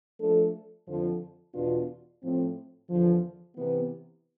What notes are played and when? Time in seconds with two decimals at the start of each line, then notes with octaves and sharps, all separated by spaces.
0.19 F3 A3 D4 A4
0.87 F2 D3 F3
1.54 E2 B2 B3 D4 F4
2.22 A2 F3 C4
2.89 E2 D3 F3
3.57 C3 E3 B3